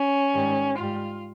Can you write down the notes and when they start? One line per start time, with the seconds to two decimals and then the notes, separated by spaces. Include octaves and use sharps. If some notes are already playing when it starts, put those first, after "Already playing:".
Already playing: C#4
0.33 G#2 D#3 G3
0.77 G#2 G3 F4